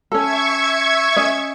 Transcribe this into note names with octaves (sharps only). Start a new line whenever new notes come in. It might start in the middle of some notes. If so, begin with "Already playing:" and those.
C#4 A4 E5 C#6 G#6
C#4 D#5